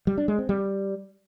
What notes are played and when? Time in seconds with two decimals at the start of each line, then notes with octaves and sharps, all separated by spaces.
0.07 G3
0.18 D4
0.28 G#3
0.38 C4
0.49 G3